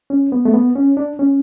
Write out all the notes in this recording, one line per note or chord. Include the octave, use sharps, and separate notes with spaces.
C#4
B3
A3
B3
C#4
D4
C#4